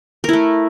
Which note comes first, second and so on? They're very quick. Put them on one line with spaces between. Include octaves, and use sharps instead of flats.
A#4 E4 A3